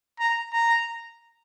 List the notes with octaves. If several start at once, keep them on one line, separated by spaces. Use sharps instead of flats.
A#5
A#5